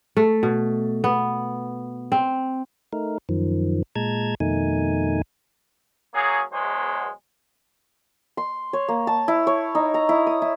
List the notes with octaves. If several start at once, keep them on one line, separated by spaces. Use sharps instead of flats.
A3
B2
B3
C4
A3 D#4 A#4
F#2 D#3 F3
A#2 G#3 A5 A#5 G#6
F2 B2 D#3 A3 D#4 G#5
F#3 A#3 C#4 G#4
E2 B2 F#3 G#3 C5
C6
C#5
A#3
A5
E4
C#5
D#4
A#5
E4
D#6
E4